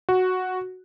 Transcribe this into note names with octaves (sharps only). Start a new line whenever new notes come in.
F#4